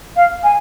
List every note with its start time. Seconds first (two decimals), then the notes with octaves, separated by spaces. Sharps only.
0.16 F5
0.43 G#5